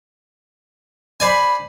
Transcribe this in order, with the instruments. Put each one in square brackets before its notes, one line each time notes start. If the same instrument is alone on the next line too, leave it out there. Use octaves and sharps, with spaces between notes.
[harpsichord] C5 D5 G#5 [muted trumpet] B5